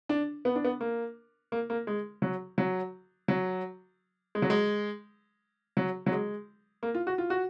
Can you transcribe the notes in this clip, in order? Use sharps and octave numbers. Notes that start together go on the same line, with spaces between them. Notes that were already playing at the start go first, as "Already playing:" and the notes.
D4
B3
D4
B3
A#3
A#3
A#3
G#3
F#3
F#3
F#3
G#3
F#3
G#3
F#3
F#3
G#3
A#3
F4
F#4
F4
F#4